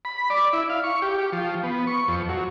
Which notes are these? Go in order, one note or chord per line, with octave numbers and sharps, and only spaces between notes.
B5
D5
E4
F5
C#6
G4
G4
F3
B3
C#6
F2
F#3